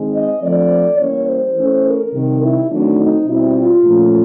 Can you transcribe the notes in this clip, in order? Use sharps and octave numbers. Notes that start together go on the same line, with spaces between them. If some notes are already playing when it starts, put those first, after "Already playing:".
Already playing: D#3 G#3 C4
D#5
D3 F3 A3 C4 D5
E3 G3 A#3 C#4 C#5
C5
E3 A3 C#4
A#4
C3 D#3 G3
E4
D#3 F#3 A3 C4 D4
D#4
B2 G3 C4 E4
F4
A#2 F3 A3 C#4